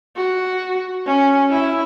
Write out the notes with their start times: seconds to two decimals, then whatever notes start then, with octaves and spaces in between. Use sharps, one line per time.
0.17 F#4
1.07 C#4
1.51 E4